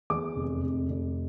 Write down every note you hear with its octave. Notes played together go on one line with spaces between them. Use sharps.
E2 D6
F1
F1
F1